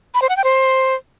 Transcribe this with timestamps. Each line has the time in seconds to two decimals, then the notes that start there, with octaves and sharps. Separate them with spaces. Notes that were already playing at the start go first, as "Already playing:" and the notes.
0.14 B5
0.22 C5
0.29 F#5
0.37 G5
0.44 C5